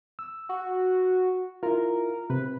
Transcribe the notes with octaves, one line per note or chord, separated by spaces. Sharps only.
E6
F#4
E4 F4 A#4
C3 B4